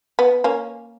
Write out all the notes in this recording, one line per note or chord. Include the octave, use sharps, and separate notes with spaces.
B3
A#3 C#4